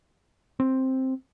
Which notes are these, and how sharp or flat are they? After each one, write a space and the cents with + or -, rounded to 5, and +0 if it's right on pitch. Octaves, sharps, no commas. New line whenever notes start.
C4 +5